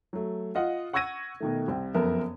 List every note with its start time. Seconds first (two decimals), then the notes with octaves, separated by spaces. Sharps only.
0.13 F#3 A3
0.55 F4 D#5 F#5
0.93 F#5 C#6 E6 G#6 A#6 D#7
1.40 B2 D#3 A3
1.68 C2 C4
1.94 F#1 F2 B3 A#4 E5